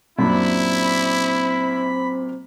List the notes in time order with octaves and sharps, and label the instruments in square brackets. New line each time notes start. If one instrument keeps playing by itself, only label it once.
[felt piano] F#2 A#2 D4 [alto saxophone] C4 [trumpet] E4 [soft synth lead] B5